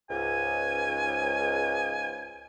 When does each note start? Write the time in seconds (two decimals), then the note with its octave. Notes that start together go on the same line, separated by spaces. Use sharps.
0.10 C#2 G#2 G#5